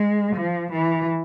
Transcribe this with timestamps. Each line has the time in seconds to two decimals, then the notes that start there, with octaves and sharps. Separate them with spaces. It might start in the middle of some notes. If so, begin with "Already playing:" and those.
Already playing: G#3
0.35 F3
0.72 E3